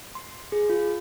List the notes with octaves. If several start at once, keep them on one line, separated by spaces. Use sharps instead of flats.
C6
G#4
F4